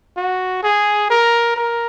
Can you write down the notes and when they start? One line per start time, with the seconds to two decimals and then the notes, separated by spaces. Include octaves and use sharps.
0.17 F#4
0.63 G#4
1.10 A#4
1.56 A#4